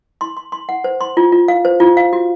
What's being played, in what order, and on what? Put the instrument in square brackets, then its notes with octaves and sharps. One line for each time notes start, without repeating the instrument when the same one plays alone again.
[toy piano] C6
C6
C6
F#5
C5
C6
F4
F4
F5
C5
F4
F5
F#4